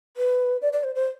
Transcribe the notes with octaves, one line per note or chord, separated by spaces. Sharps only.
B4
D5
D5
C5
C5